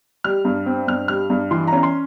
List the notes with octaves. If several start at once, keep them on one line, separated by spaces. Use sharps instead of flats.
G3 F6
G2
C4
G2 F6
G3 F6
G2
E3 C6
A#5
C#4
C6